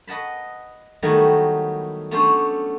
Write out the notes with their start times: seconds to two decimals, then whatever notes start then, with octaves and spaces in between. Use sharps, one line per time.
0.07 B4 D#5 F#5 A5 B5
1.03 D#3 F#3 G3 A3 B3 E4
2.11 A3 B3 C#4 D4 A4 C5